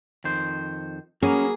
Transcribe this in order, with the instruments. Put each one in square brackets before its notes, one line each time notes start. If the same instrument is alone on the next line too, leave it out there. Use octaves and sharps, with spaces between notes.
[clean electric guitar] F2 D#3 C5
[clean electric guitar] F#3 B3 [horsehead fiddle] A#3 [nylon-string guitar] C#4 [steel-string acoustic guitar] G#4